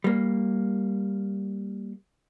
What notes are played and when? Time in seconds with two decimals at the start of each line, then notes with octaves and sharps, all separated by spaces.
0.04 G3 A#3